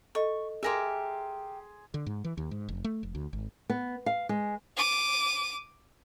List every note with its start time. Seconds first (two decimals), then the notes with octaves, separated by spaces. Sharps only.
0.15 A4 D#5 C#6
0.63 G4 G#4 A#4 E5 G#5 C6
1.94 D3
2.07 G#2
2.24 E3
2.37 D#2
2.51 G#2
2.69 F1
2.84 A3
3.03 F1
3.15 D2
3.33 G#1
3.69 B3
4.06 F5
4.29 G#3
4.77 D6 D#7